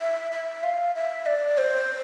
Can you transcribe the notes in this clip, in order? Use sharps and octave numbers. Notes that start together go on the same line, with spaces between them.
E5
E5
F5
E5
D5
C5